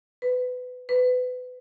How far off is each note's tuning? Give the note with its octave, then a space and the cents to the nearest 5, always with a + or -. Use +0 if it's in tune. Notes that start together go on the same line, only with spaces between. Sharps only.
B4 +25
B4 +30